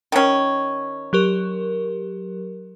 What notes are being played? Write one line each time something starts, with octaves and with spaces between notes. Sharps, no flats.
D#3 C#4
F#3 G4 A#4